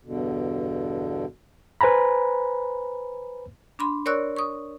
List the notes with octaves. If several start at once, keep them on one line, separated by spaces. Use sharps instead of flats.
E2 G2 B2 D3
B4 C5 G#5 A#5 B5
D4 B5 C6
A#4 C#5 D5 C#6 E6 F#6
C#6 D#6